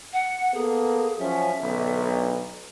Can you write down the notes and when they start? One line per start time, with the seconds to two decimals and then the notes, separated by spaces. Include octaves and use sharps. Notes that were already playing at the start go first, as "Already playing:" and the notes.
0.13 F#5
0.54 A#3 B3 G#4 A4
1.19 F3 F#3 C#4 E5
1.61 B1 D3